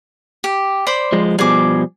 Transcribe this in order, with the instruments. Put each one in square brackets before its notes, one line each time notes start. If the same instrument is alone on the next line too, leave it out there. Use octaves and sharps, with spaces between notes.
[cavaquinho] G4
C5 D5 B5
[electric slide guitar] F3 G#3
[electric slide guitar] B2 F3 G3 [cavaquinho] G#4 D6